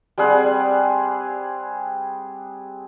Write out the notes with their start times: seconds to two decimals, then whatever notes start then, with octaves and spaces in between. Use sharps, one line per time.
0.18 G3 C4 G#4 F#5